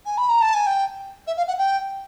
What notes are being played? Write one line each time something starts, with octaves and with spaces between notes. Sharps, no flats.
G#5
B5
A#5
A5
G#5
G5
E5
F5
F#5
G5